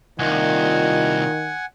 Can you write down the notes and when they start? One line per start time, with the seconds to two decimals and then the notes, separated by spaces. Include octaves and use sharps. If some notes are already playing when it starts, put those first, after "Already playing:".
0.19 C2 A#2 D#3 F4 D#5 F#5 G#5